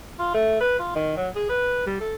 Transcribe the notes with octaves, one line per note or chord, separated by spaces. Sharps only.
F4
A3
B4
F4
D#3
F#3
G#4
B4
G3
A4